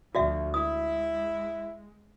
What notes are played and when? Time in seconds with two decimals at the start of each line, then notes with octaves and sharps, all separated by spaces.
0.15 D2 F3 F#4 D5 E5
0.54 G#3 E4 D#6